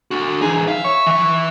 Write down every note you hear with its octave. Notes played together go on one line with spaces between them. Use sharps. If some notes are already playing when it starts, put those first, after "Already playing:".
D4 F#4
E3 D#4 G#4
E5 F5
C#6
E3 E5